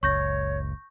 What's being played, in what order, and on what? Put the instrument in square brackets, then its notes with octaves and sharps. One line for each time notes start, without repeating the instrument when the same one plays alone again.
[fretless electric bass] F#1 C#2 [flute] C#5 [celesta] C#6 G6 A#6